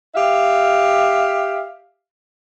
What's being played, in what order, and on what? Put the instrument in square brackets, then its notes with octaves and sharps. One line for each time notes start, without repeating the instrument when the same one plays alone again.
[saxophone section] G4 E5 F5